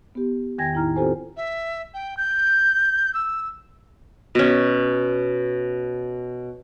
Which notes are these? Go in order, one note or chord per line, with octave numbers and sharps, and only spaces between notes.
B3 G4
E2 D#3 G5 G#5 G#6 A#6
A2 D#4 E4 A#5 F6
C4 F4 G4 A4 C5 G#5
E5
G5
G6
E6
B2 C#4